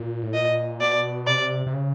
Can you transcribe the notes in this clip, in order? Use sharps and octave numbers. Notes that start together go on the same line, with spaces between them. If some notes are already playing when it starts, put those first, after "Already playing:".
Already playing: A#2
A2
A#2 D#5
B2 D5
C3 D5
C3
C#3